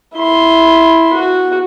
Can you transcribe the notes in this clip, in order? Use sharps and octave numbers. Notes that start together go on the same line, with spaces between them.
E4 C6
F#4